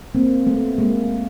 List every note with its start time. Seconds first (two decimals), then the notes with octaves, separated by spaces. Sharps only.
0.15 A#3 C4
0.47 A3 B3
0.78 G#3 A#3